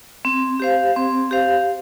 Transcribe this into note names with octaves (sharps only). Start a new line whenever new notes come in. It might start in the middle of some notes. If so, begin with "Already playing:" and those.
C4
G4 C5 F5
C4
G4 C5 F5